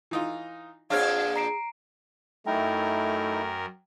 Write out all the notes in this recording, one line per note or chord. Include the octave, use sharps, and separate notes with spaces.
E3 D#4 F4
A#2 C4 D4 G#4 C#5 F5 F6 G#6
A#5 C7 D7
F#2 A3 D#4 E4 A#4 G5 A#5